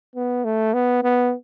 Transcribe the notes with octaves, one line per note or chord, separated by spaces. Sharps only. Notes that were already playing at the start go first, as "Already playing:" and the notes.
B3
A3
B3
B3